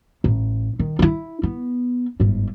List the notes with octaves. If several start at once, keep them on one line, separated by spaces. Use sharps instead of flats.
A1
D#3
D#4 E4
B3
G1 G#2